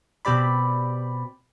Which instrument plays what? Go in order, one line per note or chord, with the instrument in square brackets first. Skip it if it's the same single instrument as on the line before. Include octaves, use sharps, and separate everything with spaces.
[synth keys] B2 C4 G4 D5 B5